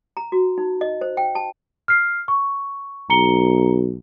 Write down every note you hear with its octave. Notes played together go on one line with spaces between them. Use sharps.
A#5
F#4
D#4
D#5
C5
G5
A5
F6 C7
C#6
B1 A#5 C#7 G7